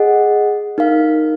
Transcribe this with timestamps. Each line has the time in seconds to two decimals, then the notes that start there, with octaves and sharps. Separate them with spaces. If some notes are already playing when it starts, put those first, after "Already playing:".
Already playing: G#4 D#5 F#5
0.78 D#4 A#4 F5